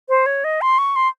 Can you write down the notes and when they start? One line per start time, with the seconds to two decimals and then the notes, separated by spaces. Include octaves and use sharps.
0.09 C5
0.26 C#5
0.44 D#5
0.61 C6
0.78 C#6
0.96 C6